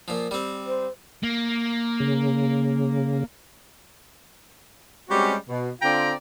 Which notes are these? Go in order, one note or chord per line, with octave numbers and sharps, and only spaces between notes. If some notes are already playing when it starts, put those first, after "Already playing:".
A#2 F3
G3 C4
C5
A#3
C#3
G3 G#3 C4 C#4 F#4 G4
B2
D3 C4 F4 D5 G5 A#5